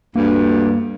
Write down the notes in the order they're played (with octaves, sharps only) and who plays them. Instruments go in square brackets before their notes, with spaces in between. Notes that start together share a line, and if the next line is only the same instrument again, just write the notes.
[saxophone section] D2 G2 [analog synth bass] A#3